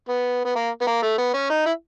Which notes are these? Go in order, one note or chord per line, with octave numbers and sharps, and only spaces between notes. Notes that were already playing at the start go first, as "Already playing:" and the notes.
B3
B3
A#3
B3
A#3
A3
B3
C#4
D#4
E4